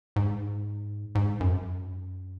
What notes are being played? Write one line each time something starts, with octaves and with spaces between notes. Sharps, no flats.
G#2
G#2
F#2